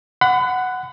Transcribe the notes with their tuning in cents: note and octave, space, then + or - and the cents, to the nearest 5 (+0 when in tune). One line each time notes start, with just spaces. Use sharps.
F#5 +0 B5 +35